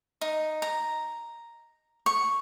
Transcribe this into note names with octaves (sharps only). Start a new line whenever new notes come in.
D#4
A#5
C#6